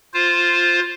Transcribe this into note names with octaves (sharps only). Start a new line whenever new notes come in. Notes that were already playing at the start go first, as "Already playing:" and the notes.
F4 C5